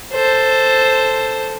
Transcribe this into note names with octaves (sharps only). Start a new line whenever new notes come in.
A4 C5